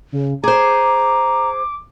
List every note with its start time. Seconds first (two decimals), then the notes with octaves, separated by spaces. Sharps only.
0.12 C#3
0.44 G#4 C5 A#5 D6